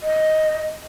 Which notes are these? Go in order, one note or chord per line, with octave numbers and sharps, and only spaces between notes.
D#5